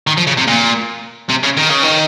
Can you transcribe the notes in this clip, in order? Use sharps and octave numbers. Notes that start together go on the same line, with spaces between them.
D#3
F3
C#3
C3
A#2
C3
C#3
D#3
C#3
D#3